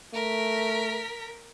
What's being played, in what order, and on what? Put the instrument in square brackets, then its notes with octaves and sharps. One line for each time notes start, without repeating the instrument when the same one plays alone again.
[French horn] A3 [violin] A#4 B6